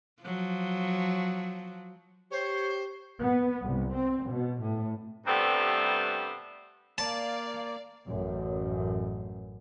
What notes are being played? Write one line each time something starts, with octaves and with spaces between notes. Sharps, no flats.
F3 F#3
G4 C5 C#5
B3
C2
C4
B2
A2
G2 C3 G3 A3 B3 C4
A#3 D5 F5 A5
A1 F#2